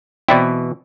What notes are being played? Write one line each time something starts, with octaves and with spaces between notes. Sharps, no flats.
B2 E3 C4 E4 D5